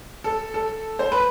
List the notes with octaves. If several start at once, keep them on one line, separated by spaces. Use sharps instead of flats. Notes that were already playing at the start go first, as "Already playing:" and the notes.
A4
A4
C5
B4